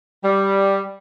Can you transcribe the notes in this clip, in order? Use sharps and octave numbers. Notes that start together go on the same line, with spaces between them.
G3